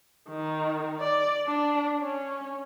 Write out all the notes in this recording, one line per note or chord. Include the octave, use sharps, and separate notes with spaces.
D#3
D5
D4
C#4